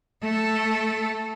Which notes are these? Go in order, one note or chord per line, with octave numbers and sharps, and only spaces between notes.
A3 A4